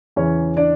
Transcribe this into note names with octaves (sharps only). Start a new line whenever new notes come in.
E2 C#3 E3 C#4 C#5
D4 D5